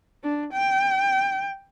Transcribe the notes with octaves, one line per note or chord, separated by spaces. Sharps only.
D4
G5